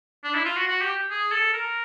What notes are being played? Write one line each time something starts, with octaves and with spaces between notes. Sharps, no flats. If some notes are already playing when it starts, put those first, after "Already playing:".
D4
E4
F4
F#4
F#4
G4
G#4
A4
A#4